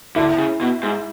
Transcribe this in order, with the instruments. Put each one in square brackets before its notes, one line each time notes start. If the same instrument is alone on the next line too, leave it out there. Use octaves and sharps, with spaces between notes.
[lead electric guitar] D3 [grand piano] E4
[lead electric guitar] C#3
B2
G#2